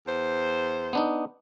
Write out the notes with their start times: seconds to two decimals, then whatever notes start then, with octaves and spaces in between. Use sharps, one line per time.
0.07 E2 C5
0.93 B3 D4 D#4